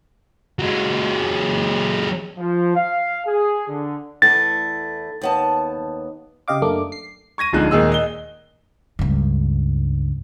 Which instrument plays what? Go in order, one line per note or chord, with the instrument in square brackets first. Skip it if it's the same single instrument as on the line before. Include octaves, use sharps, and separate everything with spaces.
[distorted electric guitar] F#3 G#3
[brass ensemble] F3
F5
G#4
D3
[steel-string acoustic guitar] E2 A3 E4 [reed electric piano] A6
[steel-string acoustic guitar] D#2 B3 A5
[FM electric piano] C#3 G4 D#5 F5 D6
F#2 A3 A#3 D4 D6
C7
[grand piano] C#6 G#6 A#6 D#7
D1 D3 F3 G#3 D#4 F#6
D#2 A#2 G#3 G#4 D#5 E6
D#5 G7
[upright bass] C#2 G2